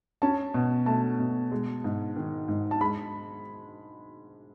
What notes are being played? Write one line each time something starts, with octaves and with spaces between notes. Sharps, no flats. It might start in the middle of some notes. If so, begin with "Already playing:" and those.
C#4 A5
B2
A3 A5
B2
G#3
G#2
D#3
G#2
A5
G#3 B5